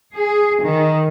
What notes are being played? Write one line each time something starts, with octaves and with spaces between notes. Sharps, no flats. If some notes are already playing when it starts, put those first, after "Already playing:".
G#4
D#3